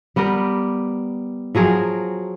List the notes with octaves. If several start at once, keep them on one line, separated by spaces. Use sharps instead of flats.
G3 B3 G4 A#4
F3 F#3 G#4 A#4